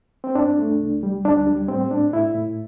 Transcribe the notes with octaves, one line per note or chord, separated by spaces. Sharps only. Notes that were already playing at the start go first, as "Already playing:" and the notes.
C4
G2 D4
A3
C2
G3
D2 D4
G3
A2 C4
A2 D4
A2 E4
A2